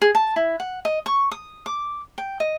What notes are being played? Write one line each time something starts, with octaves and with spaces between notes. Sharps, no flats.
G#4
A5
E4
F#5
D#5
C#6
D#6
D6
G5
D#5